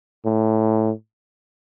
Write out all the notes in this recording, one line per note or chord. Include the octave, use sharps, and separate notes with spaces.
A2